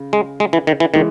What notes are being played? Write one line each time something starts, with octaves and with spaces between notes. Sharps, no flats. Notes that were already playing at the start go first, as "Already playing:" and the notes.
Already playing: C#3
G#3
G#3
E3
D#3
E3
D#3 E3 G#3